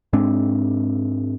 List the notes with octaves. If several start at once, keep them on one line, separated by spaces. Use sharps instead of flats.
G#2 G#3 C4 D4